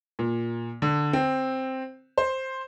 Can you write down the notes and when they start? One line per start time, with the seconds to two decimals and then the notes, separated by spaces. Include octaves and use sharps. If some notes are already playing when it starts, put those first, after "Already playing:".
0.19 A#2
0.82 D3
1.13 C4
2.18 C5